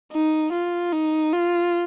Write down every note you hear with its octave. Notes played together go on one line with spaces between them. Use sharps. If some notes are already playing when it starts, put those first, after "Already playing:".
D#4
F4
D#4
F4